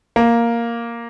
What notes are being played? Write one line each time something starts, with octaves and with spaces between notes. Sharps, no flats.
A#3